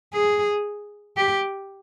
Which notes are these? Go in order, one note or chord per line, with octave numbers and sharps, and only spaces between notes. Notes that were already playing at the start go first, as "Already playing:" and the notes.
G#4
G4